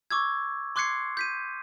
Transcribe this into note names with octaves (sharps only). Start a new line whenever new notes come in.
C#6 D6 E6 G#6
C6 D6 F#6 G#6 C7 C#7
G6 B6 D#7